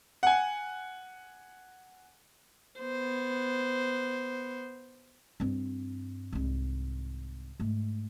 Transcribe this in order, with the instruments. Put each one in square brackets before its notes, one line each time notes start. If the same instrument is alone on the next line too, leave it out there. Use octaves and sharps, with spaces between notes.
[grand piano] F#5 G#5
[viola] B3 C5
[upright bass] G2 C4
C2 G#2
G#2 A3